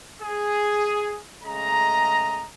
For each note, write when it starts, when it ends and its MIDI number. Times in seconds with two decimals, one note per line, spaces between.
0.22 1.18 68
1.44 2.45 49
1.44 2.45 56
1.44 2.45 57
1.44 2.45 75
1.44 2.45 82